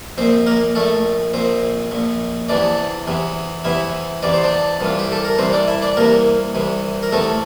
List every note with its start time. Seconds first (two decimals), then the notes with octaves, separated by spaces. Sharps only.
0.18 A#1 A#2 C4 C5
0.46 A#3 A#4
0.75 A#1 A#2 A3 A4
1.34 A#1 A#2 C4 C5
1.91 A#1 A#2
2.49 E2 C3 E3 D4 D5
3.07 E2 C3 E3
3.64 E2 C3 E3 E4 E5
4.23 E2 C3 E3 D5
4.34 C5
4.43 D4 D5
4.80 C2 C3 E3 F4
4.99 G4
5.12 A4
5.25 A#4
5.38 C2 C3 E3 C4 C5
5.53 D4 D5
5.68 E4 E5
5.82 D4 D5
5.97 C2 C3 E3 A#3 A#4
6.54 C2 C3 E3
7.03 A#4
7.12 E2 C3 E3 A3 A4